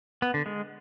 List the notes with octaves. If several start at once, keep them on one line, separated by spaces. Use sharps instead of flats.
B3
D3
G#3